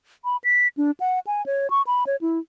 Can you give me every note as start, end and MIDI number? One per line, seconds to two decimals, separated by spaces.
0.25 0.37 83
0.44 0.68 95
0.77 0.91 62
1.00 1.19 78
1.27 1.45 80
1.46 1.70 73
1.70 1.82 85
1.87 2.04 83
2.07 2.16 73
2.21 2.39 64